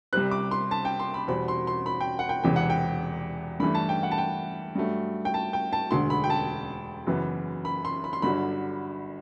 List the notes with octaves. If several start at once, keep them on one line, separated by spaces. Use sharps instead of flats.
C2 C3 G3 C4 F#6
D6
C6
A5
G5
C6
B5
E2 B2 G3 C4 B5
C6
C6
B5
G5
F#5
G5
E1 E2 C3 E3 G5
F#5
G5
G2 E3 A3 B5
A5
G5
F#5
A5
G5
G2 F#3 A3
G5
A5
G5
A5
E1 D2 D3 C6
B5
G5
A5
F#1 F#2 E3 B3
B5
C6
B5
C6
G1 G2 D3 F#3 B5